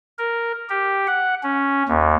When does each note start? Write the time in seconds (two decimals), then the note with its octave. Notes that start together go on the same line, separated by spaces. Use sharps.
0.18 A#4
0.69 G4
1.07 F#5
1.43 C#4
1.88 D#2